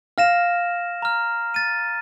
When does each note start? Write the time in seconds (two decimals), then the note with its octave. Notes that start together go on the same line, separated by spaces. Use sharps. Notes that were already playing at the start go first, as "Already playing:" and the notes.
0.18 F5 F6 A#6 E7
1.02 A#5 F6
1.54 A6 D#7